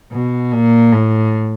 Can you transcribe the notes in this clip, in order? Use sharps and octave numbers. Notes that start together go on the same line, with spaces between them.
B2
A#2
A2